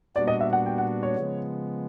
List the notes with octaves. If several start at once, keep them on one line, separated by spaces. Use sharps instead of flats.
A#2 G3 B3 D4 F#4 D5
D#5
E5
F#5
G5
F#5
C#5
C#3 F3 G#3 B3